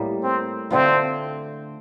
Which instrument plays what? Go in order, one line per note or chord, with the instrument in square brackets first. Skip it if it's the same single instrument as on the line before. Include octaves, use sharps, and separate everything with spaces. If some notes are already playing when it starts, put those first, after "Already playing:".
Already playing: [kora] A2 G3 A#3
[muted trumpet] C4
[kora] D3 A3 D4 F4 [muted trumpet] C4